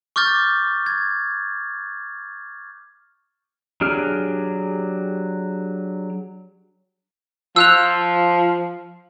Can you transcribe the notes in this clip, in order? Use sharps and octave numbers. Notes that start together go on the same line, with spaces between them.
C#6 D6 F6 G6 A6
G#6
F#3 D4 G4 G#4 F6
F3 E6 F#6 F7